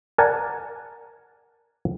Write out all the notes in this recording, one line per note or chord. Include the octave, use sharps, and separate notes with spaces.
A#4 D5 F#5 G#5 A5